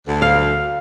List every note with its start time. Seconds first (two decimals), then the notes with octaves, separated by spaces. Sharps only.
0.08 D2
0.22 F5